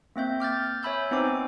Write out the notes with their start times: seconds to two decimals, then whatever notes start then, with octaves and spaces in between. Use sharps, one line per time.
0.16 A#3 C4 E5 G6
0.40 D6 F6 G6 A6
0.83 C#5 E5 G#5 B5 E6 G6
1.11 B3 C4 D#4 C5 G#5 D6